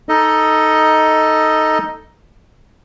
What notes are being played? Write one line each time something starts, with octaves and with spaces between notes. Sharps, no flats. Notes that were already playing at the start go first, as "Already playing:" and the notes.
D#4 A4 D#5